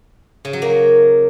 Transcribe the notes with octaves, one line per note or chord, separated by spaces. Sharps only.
C#3
F#3
A#3